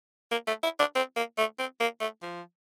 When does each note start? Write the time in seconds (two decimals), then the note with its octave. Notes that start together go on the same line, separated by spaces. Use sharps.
0.31 A#3
0.47 A3
0.63 E4
0.79 D4
0.95 C4
1.16 A#3
1.38 A3
1.59 C4
1.80 A#3
2.01 A3
2.22 F3